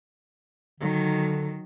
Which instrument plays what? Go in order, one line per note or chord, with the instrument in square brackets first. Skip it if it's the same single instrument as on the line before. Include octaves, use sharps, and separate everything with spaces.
[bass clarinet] D3 [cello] D#3 F#3